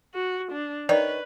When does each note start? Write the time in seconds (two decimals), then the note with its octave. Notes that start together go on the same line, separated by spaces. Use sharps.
0.14 F#4
0.52 D4
0.89 D#3 B4 C#5 D5